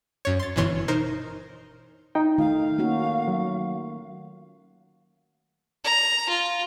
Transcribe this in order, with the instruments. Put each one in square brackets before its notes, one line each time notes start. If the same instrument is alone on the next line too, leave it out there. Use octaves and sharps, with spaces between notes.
[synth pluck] F#2 C#5
C6 A6
G1 B2 E3 C#5 C6
D#4 A#4 C5
[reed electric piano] D#4 G5
[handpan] D#3 A3 F4 [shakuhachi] F5
[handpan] A#3 C#4 F#4
[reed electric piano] F#3
[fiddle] A#5
F4